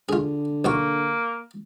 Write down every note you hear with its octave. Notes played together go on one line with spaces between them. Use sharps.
D3 F4 G#4
B1 A#3 F#4 C#6